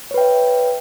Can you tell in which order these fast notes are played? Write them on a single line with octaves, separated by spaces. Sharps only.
C#5 B4 G5 E5